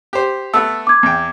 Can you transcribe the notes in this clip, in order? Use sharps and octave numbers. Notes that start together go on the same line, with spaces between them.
G4 C5
A3 B3 E6
D6 G#6
E2 G5